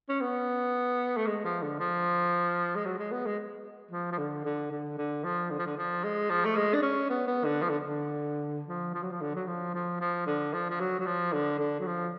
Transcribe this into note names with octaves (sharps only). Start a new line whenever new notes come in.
C#4
B3
A3
G#3
F3
D3
F3
G#3
F#3
G#3
B3
G#3
F3
F3
D3
D3
D3
D3
F3
D3
F3
D3
F3
G#3
F3
A3
G#3
D4
C#4
B3
B3
D3
F3
D3
D3
F3
F3
F#3
F3
D3
F#3
F3
F3
F3
D3
F3
F3
F#3
F#3
F3
D3
D3
F#3
F3